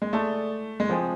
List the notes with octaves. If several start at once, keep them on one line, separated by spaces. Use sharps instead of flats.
G#3
A3 G#4 D5 A5
G#3
F3 C4 G#4 C5 G#5